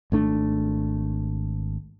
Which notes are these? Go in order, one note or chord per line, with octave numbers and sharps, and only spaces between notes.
G#1 A3 D4